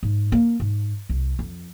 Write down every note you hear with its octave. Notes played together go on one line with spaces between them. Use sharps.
G#2
A#3
G#2
C2
F2